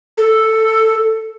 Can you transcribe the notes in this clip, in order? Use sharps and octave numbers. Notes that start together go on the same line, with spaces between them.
A4